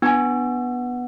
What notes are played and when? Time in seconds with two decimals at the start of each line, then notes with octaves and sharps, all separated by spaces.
0.02 B3 D4 G#5